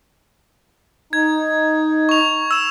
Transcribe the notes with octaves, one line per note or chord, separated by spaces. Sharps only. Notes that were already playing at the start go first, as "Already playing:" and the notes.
D#4 G#6
C#6 F7
E6 E7